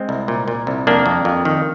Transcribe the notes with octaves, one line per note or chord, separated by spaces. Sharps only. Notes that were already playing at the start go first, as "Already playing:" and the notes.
Already playing: G#3 C4
C2
A#2
A#2
C2
F2 A#3 D4
F2
F2
D#3